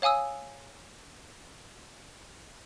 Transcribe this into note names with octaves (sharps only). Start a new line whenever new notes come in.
C#5 F5 G#5 D#6 E6